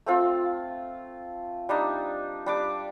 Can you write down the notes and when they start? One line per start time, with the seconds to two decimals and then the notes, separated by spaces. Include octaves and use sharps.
0.06 A3 C4 F4
1.69 G3 D4 D#4
2.46 G3 D4 D6